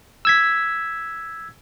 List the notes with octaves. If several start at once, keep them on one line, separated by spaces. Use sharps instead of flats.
E6 G#6 B6